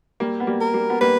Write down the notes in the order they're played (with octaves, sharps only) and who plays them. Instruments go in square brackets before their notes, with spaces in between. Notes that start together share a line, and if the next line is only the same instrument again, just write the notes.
[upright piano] G3 A#3
B3
G3 A#3
[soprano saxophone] A#4
[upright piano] G3 A#3
B3
[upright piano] G3 A#3 [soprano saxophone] B4